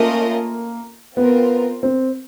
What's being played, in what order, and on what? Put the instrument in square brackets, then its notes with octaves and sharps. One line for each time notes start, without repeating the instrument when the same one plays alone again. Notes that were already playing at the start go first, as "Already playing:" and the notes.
Already playing: [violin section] A3 C#4 F4 A#4 D#5 [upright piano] A#3
[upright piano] B3 [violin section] C4 F4 A#4
[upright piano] C4